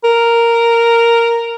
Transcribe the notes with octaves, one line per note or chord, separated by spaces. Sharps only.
A#4